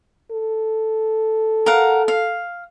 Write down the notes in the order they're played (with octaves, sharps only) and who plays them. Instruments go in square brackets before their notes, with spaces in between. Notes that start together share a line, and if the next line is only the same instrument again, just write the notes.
[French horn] A4
[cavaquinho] A#4 F5 F#5
F5